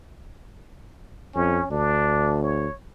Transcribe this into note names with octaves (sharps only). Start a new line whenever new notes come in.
F2 C#4
D2 D4
C#5